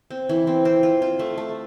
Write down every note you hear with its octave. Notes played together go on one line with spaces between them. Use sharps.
C4
E3
C4
C4
F4
F4
A3
A3